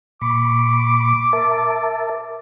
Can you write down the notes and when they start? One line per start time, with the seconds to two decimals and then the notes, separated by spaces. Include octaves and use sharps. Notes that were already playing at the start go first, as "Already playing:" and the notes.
0.22 A#2 B5 C#6 D6
1.33 A#4 E5 A5